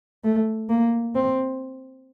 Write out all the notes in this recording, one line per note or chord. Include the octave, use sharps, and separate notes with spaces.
A3
A#3
C4